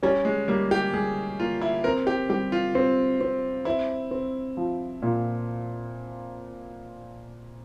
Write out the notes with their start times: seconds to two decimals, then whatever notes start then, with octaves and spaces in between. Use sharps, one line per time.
0.03 G3 C#4
0.25 G#3
0.48 G3 A#3
0.71 G4
0.94 G3 G#4
1.40 A#3 F4
1.61 E4
1.84 C4 A#4
2.07 G4
2.29 G3 G4
2.52 F4
2.75 C4
3.21 C4
3.65 C4 E4
4.11 C4
4.57 F3
5.02 A#2